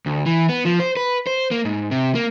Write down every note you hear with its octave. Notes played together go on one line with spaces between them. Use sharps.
D2
E3
B3
F3
C5
B4
C5
A#3
G#2
C3
A#3